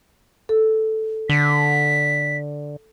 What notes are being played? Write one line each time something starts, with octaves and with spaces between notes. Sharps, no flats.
A4
D3 B6